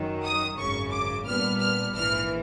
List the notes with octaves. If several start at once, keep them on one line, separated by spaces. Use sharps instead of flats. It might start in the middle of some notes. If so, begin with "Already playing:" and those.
Already playing: F#2 D#3 F#3
D#6
G#1 F#2 C#3 C#6
D6
A#2 G3 B3 D4 F6
F6
A#1 G#2 E3 F6